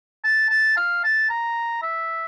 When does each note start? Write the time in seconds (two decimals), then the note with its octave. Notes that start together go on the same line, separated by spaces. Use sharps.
0.24 A5
0.50 A5
0.77 F5
1.04 A5
1.30 A#5
1.83 E5